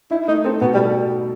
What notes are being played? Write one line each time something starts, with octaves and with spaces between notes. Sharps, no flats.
D#4 E4
A3 D#4
C4 A4
B2 B3
G3
A4